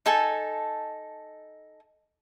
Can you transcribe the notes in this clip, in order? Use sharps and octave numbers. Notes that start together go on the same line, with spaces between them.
D#4 A4 G#5 A5